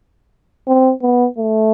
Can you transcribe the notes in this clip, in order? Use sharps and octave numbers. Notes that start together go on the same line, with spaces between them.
C4
B3
A3